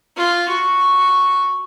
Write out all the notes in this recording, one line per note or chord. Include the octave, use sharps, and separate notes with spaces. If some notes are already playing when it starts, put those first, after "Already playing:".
F4
F#4